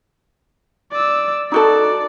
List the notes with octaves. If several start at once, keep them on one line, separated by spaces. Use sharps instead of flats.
D5 E6
D#4 F#4 A4 D5